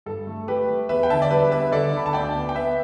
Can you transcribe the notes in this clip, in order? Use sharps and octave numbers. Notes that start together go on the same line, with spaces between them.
G2 A4
A3
A3 G4 B4
A3
E2 B4 E5
G5
D3 E5 A5
D5
G3 B4 E5
B3 B4 E5
D3 A4 D5
D3 B5
A5
D2 D5 G5
B3
G5
B3 B4 E5